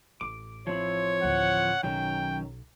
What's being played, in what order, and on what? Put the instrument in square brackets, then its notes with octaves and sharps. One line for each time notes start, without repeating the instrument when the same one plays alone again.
[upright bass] A1 [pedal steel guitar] D6
[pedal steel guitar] F3 C4 E4 [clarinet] C#5
[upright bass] A1 D2 [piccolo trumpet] F#5
[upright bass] B1 [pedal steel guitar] D#3 F#3 C#4 [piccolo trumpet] G5